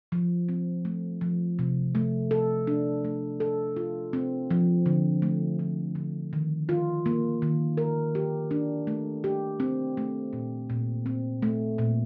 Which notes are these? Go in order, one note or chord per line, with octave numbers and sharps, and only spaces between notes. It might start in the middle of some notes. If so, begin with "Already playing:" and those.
F3
C4
A3
F3
C3
A3
A4
D4
A3
A4
F4
C4
F3
D3
A3
F3
D3
D#3
F4
A#3
D#3
A#4
G4
D4
A3
G4
C4
A3
A#2
A#2
C4
A3
A#2